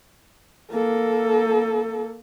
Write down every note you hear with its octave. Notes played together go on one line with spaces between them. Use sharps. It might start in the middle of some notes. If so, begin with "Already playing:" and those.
A#3 A4